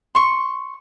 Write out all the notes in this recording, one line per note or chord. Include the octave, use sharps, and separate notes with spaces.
C6 C#6